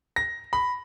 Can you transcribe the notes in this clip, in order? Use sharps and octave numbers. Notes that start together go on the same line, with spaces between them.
A#6
B5